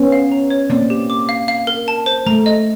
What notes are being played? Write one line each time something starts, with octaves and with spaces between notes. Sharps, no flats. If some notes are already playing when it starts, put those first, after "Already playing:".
Already playing: B3 C#4
F5
A#5
C#5
A#3 C4 D5
G4
D6
F5
F5
A#4
A5
C5
A3 A#5
D#5